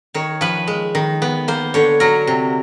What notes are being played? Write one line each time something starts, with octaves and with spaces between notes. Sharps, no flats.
D#3 C#5
F3 B4
G#3
D#3
B3
A#3 C5
D3 C#5
F#3 A#4
C3